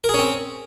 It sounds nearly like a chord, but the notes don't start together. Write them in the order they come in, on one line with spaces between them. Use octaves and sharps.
A#4 G#4 C#4 C4